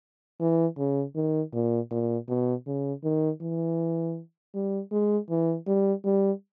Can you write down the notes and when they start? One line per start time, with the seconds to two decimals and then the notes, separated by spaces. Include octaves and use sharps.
0.40 E3
0.78 C#3
1.15 D#3
1.53 A#2
1.91 A#2
2.28 B2
2.67 C#3
3.04 D#3
3.41 E3
4.54 G3
4.91 G#3
5.30 E3
5.67 G3
6.05 G3